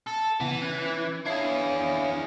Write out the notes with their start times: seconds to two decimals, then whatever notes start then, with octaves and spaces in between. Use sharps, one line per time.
0.07 A4
0.41 C#3 E3 B3
0.62 C#4 F#6 G#6
1.26 D4 E4 G#4 C#5 F5